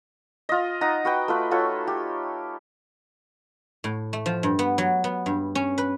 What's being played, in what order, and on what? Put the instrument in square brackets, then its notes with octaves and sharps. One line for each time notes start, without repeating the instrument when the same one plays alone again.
[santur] F4 D#5
D#4 F#5 A#5 D#6
F#4 B4 G5
A3 F4 B4
F4 F#4 A4 C#5
G4
[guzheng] A2
A3
F3
G2
B3
F#3
B3
G2
C#4
B4